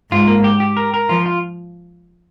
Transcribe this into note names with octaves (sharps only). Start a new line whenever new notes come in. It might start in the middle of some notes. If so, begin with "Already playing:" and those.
G#2 F4
A#3
G4
G4
A#4
A#4
F3 F4
F4